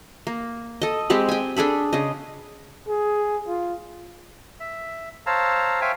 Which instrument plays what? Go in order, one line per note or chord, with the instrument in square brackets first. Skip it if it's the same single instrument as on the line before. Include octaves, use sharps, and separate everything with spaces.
[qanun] A#3
A4 D#5
G#3 C4 G4 B5
G5 G#5
D4 G#4 A4 B5
C#3 D#5
[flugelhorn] G#4
F4
[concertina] E5
C5 C#5 F5 A5 A#5 E6
C5 C#5 E5 F5 G5 G#5